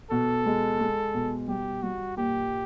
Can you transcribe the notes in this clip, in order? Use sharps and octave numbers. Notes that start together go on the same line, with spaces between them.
B2 A4
G#3
G#3
B2
G3 G4
G3 F#4
A#2 G4